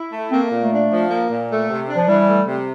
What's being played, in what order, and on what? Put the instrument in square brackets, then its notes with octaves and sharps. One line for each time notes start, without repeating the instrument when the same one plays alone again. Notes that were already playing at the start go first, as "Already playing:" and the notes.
Already playing: [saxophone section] E4
A3
[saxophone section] A#3 [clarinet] C4
[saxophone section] A#2
[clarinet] A3
[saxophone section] D4
F3
A#3
A#2
A3
C3
D4
[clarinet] F3
[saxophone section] E3 [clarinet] G3
[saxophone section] A3
C3